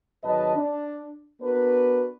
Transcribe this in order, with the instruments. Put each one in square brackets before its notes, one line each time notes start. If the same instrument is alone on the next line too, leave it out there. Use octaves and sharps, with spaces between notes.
[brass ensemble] G#1 F#3 B4 D#5 A5
D4
B3 D4 F#4 A#4 B4